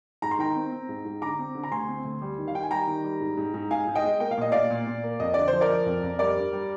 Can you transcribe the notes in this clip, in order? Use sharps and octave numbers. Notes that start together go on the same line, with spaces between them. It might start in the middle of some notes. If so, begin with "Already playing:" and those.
G#2 A#5
C6
D#3 G5 A#5
C4
C4
G#2
G#2
D3 A#5 D6
C4
D3
A#5
D2 G#5 C6
C4
D2
G3
D#3
F5
D#3 G5
G#5
G3 G5 A#5
D#3
G3
G#2
G#2
G#2
G#2 F5 G#5
G#2
D#5 G5
G#3
A#3 G5
F5
A#2 D#5
A#2 D5 F5
A#2
A#2
A#3
F2 D#5
D3 D5
C5
F3
A#4 D5
F3
F2
F2
G3 A#4 D5
G2
G3